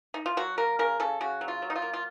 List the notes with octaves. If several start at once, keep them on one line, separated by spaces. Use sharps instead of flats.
D#4
F4
F#3 F#4
A#3 A#4
C#3 A#4
C#3 A4
C#3 F#4
F#3
F4
F#3
D#4
F4
A#3
F4